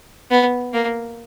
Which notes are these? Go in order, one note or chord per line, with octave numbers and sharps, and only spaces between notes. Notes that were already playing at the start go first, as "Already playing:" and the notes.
B3
A#3